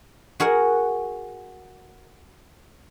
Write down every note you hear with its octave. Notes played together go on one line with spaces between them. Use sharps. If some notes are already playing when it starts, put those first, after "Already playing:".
F#4 G#4 A#4 F#5